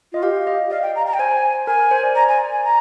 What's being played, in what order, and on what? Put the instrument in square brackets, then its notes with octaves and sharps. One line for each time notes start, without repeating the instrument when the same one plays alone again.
[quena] F4 [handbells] D#5
[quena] G4 [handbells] F5
[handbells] D#5
[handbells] D5 [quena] F5
[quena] G5
A#5
A#5
G5
[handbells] C5 [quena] G#5
[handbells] A#4 [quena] G#5
[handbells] A#4
C5
D5
[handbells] D5 [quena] A#5
[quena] G#5
G#5
A#5